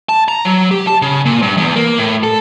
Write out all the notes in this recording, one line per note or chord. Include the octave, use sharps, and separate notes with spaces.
A5
A#5
F#3
G4
A5
C#3
A#2
G2
E2
A#3
A2
A4